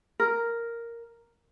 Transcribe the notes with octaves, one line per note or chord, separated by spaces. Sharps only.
A#4